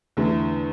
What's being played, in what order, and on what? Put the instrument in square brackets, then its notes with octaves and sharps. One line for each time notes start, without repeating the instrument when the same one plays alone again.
[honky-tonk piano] E2 D3 A3 E4